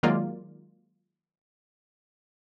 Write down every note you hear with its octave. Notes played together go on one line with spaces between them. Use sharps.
D#3 F#3 G#3 A#3 F4 D5